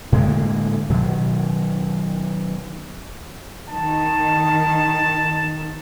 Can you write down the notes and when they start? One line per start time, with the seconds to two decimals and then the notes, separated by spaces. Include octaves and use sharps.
0.12 A2 D3 G#3 A#3
0.90 B2 D#3 F#3
3.69 D#3 A5